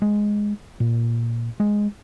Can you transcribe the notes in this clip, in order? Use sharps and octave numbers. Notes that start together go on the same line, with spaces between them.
G#3
A#2
G#3